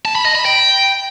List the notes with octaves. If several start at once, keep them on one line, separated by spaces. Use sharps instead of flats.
A5
B5
D#5
B5
G5